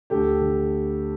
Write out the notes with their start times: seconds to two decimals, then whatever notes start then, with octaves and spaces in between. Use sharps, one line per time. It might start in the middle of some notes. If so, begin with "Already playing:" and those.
0.10 D2 G4 A4
0.41 D3